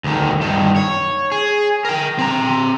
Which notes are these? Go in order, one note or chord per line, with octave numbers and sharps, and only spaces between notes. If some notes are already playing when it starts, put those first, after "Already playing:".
D2 D#3
G2 D#3
C#5
G#4
A#4 G5
C4 A#5